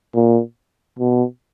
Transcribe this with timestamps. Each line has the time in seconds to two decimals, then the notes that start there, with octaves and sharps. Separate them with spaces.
0.15 A#2
0.99 B2